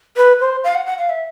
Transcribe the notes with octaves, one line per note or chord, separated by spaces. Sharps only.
B4
C5
F5
F#5
F#5
F5
E5